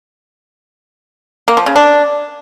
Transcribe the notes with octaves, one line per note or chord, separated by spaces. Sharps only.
A#3
F3
C#3
D4